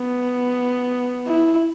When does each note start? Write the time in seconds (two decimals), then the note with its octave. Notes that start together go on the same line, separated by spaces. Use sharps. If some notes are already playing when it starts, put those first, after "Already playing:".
Already playing: B3
1.27 E4